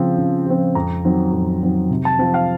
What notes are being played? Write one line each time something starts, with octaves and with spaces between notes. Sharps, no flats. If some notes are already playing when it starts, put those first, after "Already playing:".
Already playing: C#3 F3 C4
C#3
F3 C4
F2 A#5
D#3 F#3 C4
F2
D#3 F#3 C4
C3
A5
F3 C4
F5